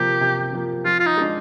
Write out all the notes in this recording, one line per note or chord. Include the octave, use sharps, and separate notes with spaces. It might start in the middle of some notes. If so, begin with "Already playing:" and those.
Already playing: C3 F3 A#3 G4
C3
F3 A#3
F3 F4
F4
D#4
G#3 D4